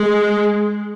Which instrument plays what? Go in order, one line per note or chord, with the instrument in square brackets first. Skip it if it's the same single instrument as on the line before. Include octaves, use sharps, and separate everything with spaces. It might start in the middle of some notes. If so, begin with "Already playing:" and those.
Already playing: [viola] G#3